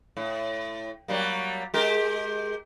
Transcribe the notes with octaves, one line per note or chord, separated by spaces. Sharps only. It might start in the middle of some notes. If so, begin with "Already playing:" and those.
A2
F#3 G3 A#3
G#3 G4 A#4